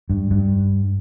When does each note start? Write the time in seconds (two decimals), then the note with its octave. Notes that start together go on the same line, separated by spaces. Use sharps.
0.10 G2
0.31 G2